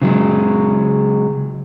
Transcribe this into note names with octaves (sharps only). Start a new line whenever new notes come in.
C#3 F#3 G#3